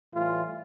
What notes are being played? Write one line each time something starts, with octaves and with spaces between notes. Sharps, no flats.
A2 E3 G3 F4